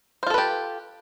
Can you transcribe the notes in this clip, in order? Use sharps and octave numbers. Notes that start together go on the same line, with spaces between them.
F4 G4 A4 B4 C5